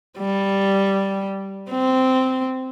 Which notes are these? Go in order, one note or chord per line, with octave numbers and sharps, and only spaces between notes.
G3
C4